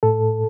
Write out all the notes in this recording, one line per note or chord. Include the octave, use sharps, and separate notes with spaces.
A2 A4